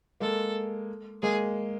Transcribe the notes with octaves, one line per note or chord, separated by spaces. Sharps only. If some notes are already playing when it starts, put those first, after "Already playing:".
G#3 A#3 A4
G#3 A#3 G#4